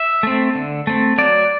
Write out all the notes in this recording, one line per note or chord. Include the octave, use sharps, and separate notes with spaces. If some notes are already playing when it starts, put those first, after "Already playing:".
Already playing: E5
A3 C4
D3
A3 C4
F#3 D5